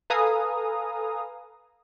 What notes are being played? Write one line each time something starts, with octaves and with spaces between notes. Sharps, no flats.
A4 B4 F5 G#5 A#5 D#6